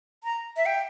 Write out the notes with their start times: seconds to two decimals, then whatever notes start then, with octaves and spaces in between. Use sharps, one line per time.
0.24 A#5
0.57 E5
0.66 G5